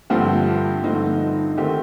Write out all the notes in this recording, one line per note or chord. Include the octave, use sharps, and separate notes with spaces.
G2 D3 F3 A3 C4 G4
G2 D3 F3 A3 C4 D#4
D#4
D#3 A3 C4 G4